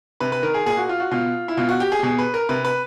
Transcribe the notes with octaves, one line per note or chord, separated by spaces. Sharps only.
C3 B4
B4
D#3 A#4
G#4
A#2 G#4
F#4
F4
F#4
B2 F4
E4
B2 F4
F#4
G4
G#4
G4
B2 G#4
B4
A#4
C3 B4
B4